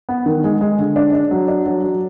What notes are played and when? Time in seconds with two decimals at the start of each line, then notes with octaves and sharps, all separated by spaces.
0.09 B3
0.26 D#3
0.44 G#3
0.61 G#3
0.79 D3
0.96 D4
1.13 D4
1.31 F#3
1.48 D4
1.66 F#3
1.84 F#3